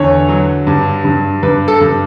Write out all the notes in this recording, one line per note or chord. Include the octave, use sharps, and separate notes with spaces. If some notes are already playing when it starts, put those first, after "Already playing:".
Already playing: E2 D3 C#5
F#3
G2
G2
G2 B4
A4
G2